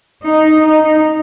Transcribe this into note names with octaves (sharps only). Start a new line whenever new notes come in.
D#4
D#4